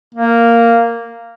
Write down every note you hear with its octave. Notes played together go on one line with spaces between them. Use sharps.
A#3